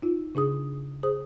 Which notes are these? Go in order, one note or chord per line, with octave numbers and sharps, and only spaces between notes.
D#4 F4
C#3 D4 G#4 D#6
G#4 C5 D#6